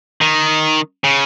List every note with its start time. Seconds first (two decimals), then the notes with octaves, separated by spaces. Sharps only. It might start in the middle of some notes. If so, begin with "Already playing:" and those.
0.21 D#3
1.04 C#3